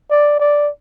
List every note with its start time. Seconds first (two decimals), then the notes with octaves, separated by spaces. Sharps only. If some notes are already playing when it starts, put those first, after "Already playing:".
0.10 D5
0.39 D5